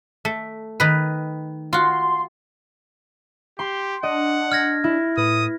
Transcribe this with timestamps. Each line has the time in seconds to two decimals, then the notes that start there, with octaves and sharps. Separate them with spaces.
0.25 A3
0.80 D#3 B4
1.73 F4 F#4 C6
3.59 G4 C6
4.03 D4 D#5 F#5
4.52 F6 G#6 A#6
4.84 E4
5.18 A2 B4 D#6